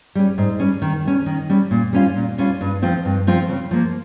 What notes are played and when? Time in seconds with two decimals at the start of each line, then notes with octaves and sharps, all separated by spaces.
0.15 G3 C#4
0.38 G#2
0.60 G3 C#4
0.82 D#3
1.05 G3 C#4
1.26 D#3
1.50 G3 C#4
1.71 A#2
1.93 G3 C#4 F4
2.15 A#2
2.38 G3 C#4 F4
2.61 G2
2.82 F3 C4 F4
3.05 G2
3.27 F3 C4 F4
3.49 C#3
3.71 F3 A#3